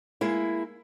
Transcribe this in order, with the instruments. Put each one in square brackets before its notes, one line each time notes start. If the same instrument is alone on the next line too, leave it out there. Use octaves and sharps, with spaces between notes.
[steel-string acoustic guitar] G#3 A#3 E4